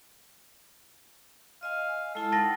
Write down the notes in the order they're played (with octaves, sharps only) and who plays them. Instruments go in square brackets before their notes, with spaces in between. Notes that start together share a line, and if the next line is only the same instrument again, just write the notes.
[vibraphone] D#5 G#5 [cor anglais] F5
[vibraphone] G#3 E4 A5 [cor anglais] A4
[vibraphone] D#4 F#5 G5 [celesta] A5 A6 A#6